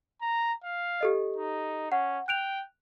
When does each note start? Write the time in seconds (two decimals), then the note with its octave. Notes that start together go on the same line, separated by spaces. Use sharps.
0.21 A#5
0.64 F5
1.01 G4 A4 D#5
1.37 D#4
1.92 C#4 F#5
2.28 G5 F#6 D7 F7